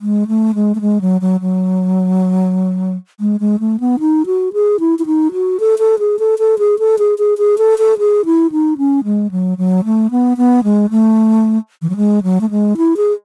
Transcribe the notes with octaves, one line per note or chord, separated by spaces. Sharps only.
G#3
A3
G#3
A3
G#3
F#3
F#3
F#3
G#3
G#3
A3
B3
D#4
F#4
G#4
E4
E4
D#4
F#4
A4
A4
G#4
A4
A4
G#4
A4
G#4
G#4
G#4
A4
A4
G#4
E4
D#4
C#4
G#3
F#3
F#3
A3
B3
B3
G#3
A3
E3
F#3
G#3
F#3
A3
G#3
E4
G#4